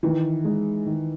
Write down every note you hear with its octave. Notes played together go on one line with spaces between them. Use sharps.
D#3 E3
G#3 D#4
D#3